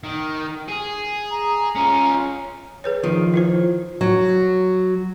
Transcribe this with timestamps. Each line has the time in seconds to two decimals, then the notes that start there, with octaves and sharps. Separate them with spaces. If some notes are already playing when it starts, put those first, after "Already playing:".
0.04 D#3
0.68 G#4
1.31 A#5
1.75 C#4 F4
2.84 G#4 B4 C#5
3.03 D#3 F3 D#4
3.34 E4 F4 C5
4.01 F#3